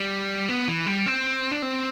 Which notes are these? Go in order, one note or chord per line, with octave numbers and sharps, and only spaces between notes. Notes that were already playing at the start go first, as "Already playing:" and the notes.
Already playing: G3
B3
E3
G3
C4
D4
C4